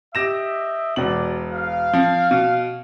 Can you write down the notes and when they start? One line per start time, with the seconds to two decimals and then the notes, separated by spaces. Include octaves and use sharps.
0.15 G4 D#5 E5 A#6 E7
0.96 E1 B2 D5 F#7
1.54 F5
1.93 F3 C4
2.31 B2